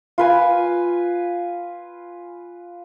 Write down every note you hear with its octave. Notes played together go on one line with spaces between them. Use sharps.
F4 B4 G#5